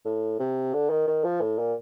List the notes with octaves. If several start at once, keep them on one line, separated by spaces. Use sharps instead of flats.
A2
C3
D3
D#3
D#3
F3
A2
A#2